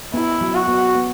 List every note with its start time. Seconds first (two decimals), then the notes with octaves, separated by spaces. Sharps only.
0.14 B3 E4
0.41 F#3
0.54 F#4
0.68 B3
0.95 B3